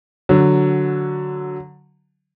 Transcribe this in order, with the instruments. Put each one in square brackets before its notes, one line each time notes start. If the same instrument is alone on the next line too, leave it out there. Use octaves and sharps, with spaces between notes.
[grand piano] D3 F#3